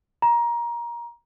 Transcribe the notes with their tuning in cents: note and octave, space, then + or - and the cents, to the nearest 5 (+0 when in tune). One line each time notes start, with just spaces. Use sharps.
A#5 +20